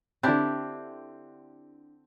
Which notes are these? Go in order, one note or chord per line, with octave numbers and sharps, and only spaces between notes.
D3 C4 D4 E4 G4